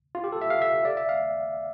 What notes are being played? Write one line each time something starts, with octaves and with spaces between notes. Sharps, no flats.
F4
G4
A4
E5
F5
E5
D5
E5
F5